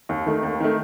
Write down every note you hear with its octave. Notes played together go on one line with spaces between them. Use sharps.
D#2
D#3 A3
D#2
D#3 A3